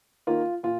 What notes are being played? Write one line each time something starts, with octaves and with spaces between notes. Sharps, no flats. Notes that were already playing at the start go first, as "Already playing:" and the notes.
D#3 A#3 F4
A#2 F4